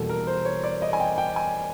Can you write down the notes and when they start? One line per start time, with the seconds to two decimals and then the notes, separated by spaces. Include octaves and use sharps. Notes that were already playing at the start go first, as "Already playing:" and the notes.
Already playing: E2 B2 G3 A#3 A4
0.09 A#4
0.27 C5
0.45 C#5
0.64 D5
0.82 D#5
0.93 G#5
1.00 G5
1.18 G5
1.36 G#5